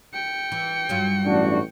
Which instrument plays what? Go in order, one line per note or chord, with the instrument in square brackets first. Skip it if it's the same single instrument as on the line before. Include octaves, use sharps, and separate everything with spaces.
[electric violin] G5 C#7
[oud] E3
G2 F#3 F4
[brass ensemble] A1 D4 F#4